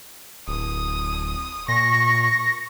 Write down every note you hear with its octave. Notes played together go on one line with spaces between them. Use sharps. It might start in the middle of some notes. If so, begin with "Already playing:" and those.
D1 D#6
A#2 C#6 A#6